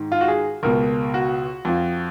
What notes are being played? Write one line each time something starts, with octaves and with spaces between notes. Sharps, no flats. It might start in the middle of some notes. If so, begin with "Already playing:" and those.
Already playing: G#2 D#3
F4
F#4
G#4
C#2 B2 A#4
F#4
F2 F3